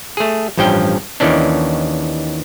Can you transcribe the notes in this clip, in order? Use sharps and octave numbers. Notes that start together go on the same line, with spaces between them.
A3 G#4
A1 G2 F3 C#4 G5
D#2 D#3 E3 C#4 D4